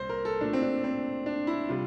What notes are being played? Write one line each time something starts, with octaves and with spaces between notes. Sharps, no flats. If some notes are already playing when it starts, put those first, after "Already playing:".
Already playing: C2 A#2 C5
A#4
A4
A#2 A3 D4
C4
D4
C4
D4
E4
C3 G3 F4